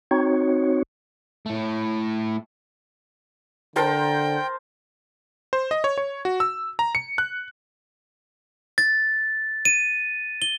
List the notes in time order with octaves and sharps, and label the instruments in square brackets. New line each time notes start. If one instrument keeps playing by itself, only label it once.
[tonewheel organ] C4 D#4 F#4 C#5
[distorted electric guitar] A2 A3
[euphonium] D3 [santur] A#4 C5 A5 [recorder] G5
[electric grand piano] C5
D#5
C#5
C#5
F#4
E6
A#5
C#7
F#6
[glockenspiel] A6
D#7
G7